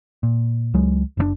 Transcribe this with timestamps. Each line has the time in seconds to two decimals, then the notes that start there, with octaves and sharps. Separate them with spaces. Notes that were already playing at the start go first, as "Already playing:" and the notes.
0.23 A#2
0.74 C#2 F#3 G#3
1.17 F#1 C3 D4